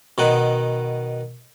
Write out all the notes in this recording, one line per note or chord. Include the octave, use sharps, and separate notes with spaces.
B2 D#3 F#5